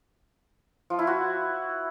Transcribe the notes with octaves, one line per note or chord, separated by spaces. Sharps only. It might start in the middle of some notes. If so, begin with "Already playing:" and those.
F3
E4
F#4